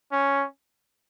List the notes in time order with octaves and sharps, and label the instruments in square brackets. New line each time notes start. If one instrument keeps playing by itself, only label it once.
[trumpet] C#4